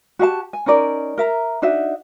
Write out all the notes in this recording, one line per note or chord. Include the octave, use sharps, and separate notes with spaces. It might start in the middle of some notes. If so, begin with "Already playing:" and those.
F#4 G4 F5 A5
G#5
C#4 D#4 A#4 D5
A#4 E5 A#5
D4 D#4 F#4 E5